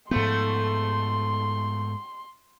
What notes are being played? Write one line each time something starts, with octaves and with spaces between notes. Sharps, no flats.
G#2 F3 A3 B3 C6